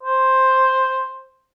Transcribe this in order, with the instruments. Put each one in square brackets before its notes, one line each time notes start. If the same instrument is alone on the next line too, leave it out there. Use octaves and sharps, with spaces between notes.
[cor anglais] C5